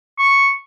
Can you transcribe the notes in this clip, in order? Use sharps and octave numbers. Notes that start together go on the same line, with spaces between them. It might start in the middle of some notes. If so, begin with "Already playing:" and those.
C#6